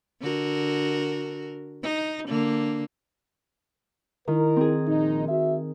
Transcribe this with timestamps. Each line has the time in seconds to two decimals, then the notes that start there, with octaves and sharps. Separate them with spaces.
0.21 D3 F#4 A#4
1.83 D#4
2.27 D3 A#3
4.28 D#3 E4 A#4
4.56 C4 G#4
4.88 A#1 D#4
5.28 F#4 E5